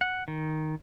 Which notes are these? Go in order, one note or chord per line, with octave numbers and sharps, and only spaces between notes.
F#5
D#3